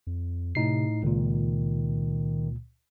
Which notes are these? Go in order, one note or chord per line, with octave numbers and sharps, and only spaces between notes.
F2
A2 C3 D#4 C7
C#2 A#2 D#3